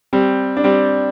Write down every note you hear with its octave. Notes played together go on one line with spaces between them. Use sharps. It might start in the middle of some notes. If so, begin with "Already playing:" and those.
G3 C4
D4
G3 C4